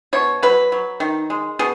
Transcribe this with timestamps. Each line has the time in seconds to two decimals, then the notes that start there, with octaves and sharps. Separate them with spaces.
0.13 B2 C#5
0.43 F#3 B4
0.72 F#3
1.00 D#3
1.30 G#3
1.59 B2 G#4